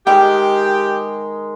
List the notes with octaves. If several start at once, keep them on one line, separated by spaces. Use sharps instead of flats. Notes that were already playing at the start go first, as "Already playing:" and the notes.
D#3 G#3 G4 G5